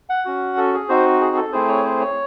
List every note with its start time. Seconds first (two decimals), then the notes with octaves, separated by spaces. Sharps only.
0.10 F#5
0.25 C#4 F#4
0.57 A4
0.74 G#4
0.89 C4 D#4 F#4 C5
1.21 G#4
1.36 A4
1.52 A3 C4 E4 G#4 C5
1.68 C#5
1.84 C5
2.00 C#5